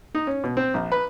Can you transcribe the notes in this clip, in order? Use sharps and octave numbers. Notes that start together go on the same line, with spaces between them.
D#4
C#4
B2
C4
A#1
B4